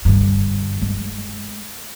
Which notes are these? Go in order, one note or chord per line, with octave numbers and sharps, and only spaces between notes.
G2 D3
G#3